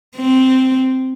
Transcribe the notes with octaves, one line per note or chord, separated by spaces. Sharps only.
C4